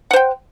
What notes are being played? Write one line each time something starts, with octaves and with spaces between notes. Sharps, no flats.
C5 F#5 G5